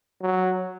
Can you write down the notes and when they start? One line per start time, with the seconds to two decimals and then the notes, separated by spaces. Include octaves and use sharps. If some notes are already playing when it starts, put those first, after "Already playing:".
0.22 F#3